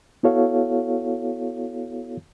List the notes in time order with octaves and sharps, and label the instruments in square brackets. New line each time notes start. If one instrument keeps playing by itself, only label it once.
[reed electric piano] B3 E4 F#4 A4 C#5 F5